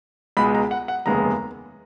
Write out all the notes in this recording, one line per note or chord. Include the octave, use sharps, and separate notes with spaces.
C#2 B2 G#3 B5
A#5
F#5
F#5
F1 D#2 C#3 G#3 B3 A#5